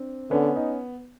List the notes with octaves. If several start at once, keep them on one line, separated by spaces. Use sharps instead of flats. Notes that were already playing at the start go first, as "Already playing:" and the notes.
Already playing: C4 D4
D3 B3 C#4
D#4